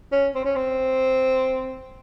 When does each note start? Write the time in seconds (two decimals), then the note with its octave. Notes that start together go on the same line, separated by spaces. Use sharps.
0.12 C#4
0.35 C4
0.45 C#4
0.56 C4